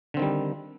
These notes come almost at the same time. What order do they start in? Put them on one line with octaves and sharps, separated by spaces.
D3 C4 D#3 G3